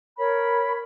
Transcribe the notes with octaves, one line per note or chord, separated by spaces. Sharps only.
A#4 C#5 B5